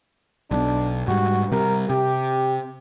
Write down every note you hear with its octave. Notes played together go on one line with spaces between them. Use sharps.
B1 D4
G#2 G3 F#4
C3 G3 A#4
C3 G4